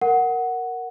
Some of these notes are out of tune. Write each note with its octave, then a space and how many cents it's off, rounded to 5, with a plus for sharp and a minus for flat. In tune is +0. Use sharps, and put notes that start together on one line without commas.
A#4 +0 F#5 +0